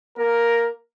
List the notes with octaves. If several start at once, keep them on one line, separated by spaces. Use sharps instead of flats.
A#3 A#4